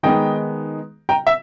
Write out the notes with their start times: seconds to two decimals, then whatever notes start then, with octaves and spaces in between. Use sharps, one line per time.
0.03 D#3 G#3 B3 D#4 D#5 G5
1.09 G5 A#5
1.27 E5